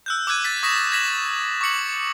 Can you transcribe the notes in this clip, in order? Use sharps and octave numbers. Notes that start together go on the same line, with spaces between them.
E6 F#6 G6
D6 E6 F#6 G#6 D#7
E6 A6 B6
C#6 D#6 A#6 B6 E7
G#6 A#6 B6 E7 F#7
C#6 D6 C#7 F#7